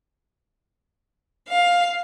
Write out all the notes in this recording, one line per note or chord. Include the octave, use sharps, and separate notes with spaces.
F5